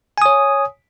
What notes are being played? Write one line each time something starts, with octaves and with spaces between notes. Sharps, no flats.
C#5 G#5 D#6